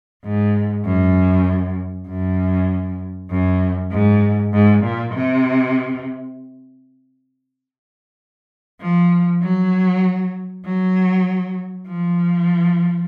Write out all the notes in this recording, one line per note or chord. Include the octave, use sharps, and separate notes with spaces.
G#2
F#2
F#2
F#2
G#2
G#2
A#2
C3
F3
F#3
F#3
F3